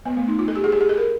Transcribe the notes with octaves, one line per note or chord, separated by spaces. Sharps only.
B3
A3
D#4
F4
A4
G4
G#4
G4
G#4
A4
A#4